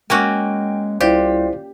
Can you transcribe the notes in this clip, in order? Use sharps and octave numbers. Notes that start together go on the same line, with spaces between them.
G#3 A#3 C#4 F#4 G5
C2 E4 F4 G4 C5 D5 F5